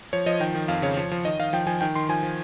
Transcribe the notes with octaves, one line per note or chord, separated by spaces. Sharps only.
F3 C#5
F3 D#5
D#3 G5
D#3
F2 F5
C#3 C#5
F3
F3
D#3 D#5
D#3 F5
F3 G5
F3 G#5
D#3 G5
D#3 C6
F3 G#5
F3